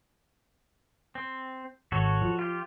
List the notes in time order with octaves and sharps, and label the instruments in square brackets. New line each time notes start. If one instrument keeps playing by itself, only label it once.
[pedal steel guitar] C4
[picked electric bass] G#1 [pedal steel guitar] F#4 A4 C#5
[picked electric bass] F3
[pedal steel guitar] F4 G4